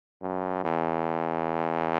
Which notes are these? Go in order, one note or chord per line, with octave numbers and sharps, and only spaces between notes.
F#2
E2